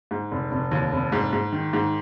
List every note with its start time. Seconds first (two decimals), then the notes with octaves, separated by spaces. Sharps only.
0.11 G#2
0.32 F1
0.52 F1
0.72 D#2
0.93 F1
1.12 G#2
1.33 G#2
1.52 D#3
1.73 G#2